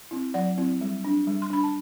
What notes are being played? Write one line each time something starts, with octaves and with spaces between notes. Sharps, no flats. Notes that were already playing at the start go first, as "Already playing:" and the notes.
C4 E4
F#3 D5 F#5
C4 E4
G3
D4
G3
C6
D4 B5
A5